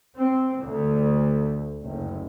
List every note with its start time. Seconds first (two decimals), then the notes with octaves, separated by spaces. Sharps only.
0.15 C4
0.63 D2
1.84 F#1